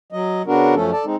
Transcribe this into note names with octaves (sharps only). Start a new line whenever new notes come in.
F#3 D#5
C#3 B3 D4 F#4 A#4
F#2 F3 A3 C#4 A4
A4 D5 A5
G#3 C4 D#4